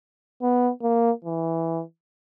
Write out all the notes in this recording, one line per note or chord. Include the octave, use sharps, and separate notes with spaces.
B3
A#3
E3